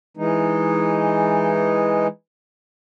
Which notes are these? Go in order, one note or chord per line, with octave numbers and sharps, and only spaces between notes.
E3 G#3 D#4